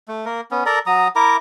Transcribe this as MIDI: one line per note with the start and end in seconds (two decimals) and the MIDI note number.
0.08 0.25 57
0.25 0.41 58
0.25 0.41 70
0.51 0.64 59
0.51 0.64 61
0.66 0.79 69
0.66 0.79 70
0.66 0.79 74
0.66 0.79 82
0.86 1.08 54
0.86 1.08 82
0.86 1.08 87
1.16 1.37 64
1.16 1.37 70
1.16 1.37 82
1.16 1.37 86